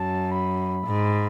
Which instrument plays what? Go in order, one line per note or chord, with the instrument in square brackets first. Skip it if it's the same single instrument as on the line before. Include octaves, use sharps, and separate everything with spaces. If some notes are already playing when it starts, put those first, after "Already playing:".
Already playing: [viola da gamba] F#2 [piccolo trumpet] A5
[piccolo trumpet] B5
[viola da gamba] G#2